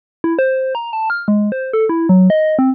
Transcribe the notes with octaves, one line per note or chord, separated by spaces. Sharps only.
E4
C5
A#5
A5
F6
G#3
C5
A4
E4
F#3
D#5
C4